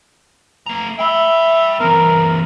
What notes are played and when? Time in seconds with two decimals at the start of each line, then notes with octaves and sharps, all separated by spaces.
0.66 A3 A#5
0.99 E5 G5 B5
1.80 E3 C4 A#4